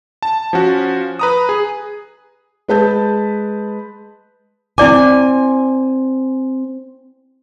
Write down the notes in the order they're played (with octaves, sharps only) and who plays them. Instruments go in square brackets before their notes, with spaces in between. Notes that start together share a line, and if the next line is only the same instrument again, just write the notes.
[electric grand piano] A5
F3 C#4 F#4
B4 A#5 D#6
G#4
[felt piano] G#3 B4 A5 G6
[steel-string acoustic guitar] C4 G#5 [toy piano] E4 D5 D6